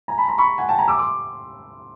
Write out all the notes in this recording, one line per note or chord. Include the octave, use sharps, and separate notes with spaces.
G#5 A#5
A5 B5
A#5 C6
B5 C#6
F#5 G#5
G5 A5
G#5 A#5
D6 E6
C6 D6